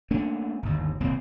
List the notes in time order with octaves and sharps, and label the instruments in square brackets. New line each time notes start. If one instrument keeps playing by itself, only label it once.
[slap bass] A3 A#3 C#4 D4
G1 D#2
D#1 C2 A#3 C4